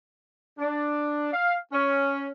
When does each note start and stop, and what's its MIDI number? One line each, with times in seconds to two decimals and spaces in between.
0.59 1.32 62
1.32 1.57 77
1.73 2.27 61